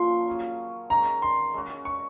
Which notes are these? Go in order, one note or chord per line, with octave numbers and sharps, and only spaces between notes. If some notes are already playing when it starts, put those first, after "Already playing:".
Already playing: A#2 F3 A#3 C#4 C6
F#3 C#4 G#4
D#3 G#3 C#4 F#4 A#5
C6
G#3 C#4 F#4
C#6